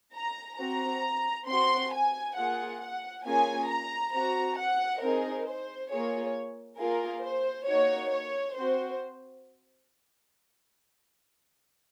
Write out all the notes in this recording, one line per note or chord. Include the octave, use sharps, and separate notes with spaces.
A#5
C4 F#4 A#5
C4 F#4 C6
G#5
A#3 F4 G#4 F#5
F#5
A#3 C#4 F4 G#4 G#5
A#5
C4 F#4 A#5
F#5
C4 D#4 G#4 A#4
C5
A#3 F4 G#4 C#5
A#3 F4 G#4 A#4
C5
A#3 D#4 F#4 C#5
C#5
C4 F#4 C5